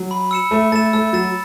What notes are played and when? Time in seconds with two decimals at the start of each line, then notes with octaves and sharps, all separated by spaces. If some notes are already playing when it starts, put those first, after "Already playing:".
Already playing: F#3
0.11 B5
0.31 E6 C#7 E7
0.51 A3 E6
0.72 A3 A6 E7
0.93 A3 E6
1.13 F#3 A6 E7